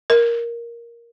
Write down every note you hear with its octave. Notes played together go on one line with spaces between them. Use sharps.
A#4